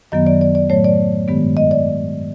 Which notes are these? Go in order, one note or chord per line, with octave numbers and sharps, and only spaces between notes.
F#2 D#3 F#3 B3 D#5
D5
D5
D5
A2 F#3 A3 C#5
D5
G2 D#3 G#3 B3
D#5
D5